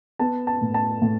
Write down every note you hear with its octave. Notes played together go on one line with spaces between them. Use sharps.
B3 A5
A5
A2
A5
A2